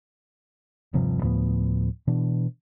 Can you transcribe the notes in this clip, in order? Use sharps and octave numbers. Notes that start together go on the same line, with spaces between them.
D#1 G2 C3 F3
D2 A2 F3 B3
B2 E3 D4